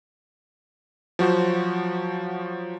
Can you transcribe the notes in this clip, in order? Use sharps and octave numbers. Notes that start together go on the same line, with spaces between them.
F3 F#3 F#4 C5